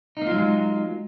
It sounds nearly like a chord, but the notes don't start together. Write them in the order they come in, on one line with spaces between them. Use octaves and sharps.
D#4 A#3 F4 F#3 G#3